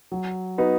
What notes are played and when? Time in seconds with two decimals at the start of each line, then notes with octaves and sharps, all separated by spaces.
0.12 F#3
0.58 B3 D#4 F#4 B4